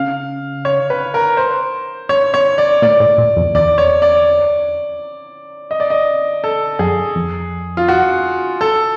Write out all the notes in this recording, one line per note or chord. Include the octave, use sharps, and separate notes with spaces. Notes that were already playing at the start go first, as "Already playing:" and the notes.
Already playing: C#3 F5
C#5
B4
A#4
C5
C#5
C#5
D5
A#2 D5
A2
A#2
F2
E2 D5
C#5
D5
D#5
D5
D#5
A4
F#2 G#4
F2
F4
F#4
A4